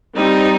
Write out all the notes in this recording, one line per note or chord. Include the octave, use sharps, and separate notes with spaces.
G3 C4 D#4